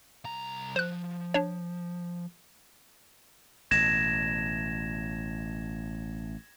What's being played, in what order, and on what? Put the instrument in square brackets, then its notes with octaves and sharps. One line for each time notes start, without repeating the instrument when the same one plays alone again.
[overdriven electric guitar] C2 A#5
[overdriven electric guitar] F3 [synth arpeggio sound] C5 F#6
[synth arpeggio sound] D4 C#5
[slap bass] A1 B2 [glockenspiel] G#6 A#6 E7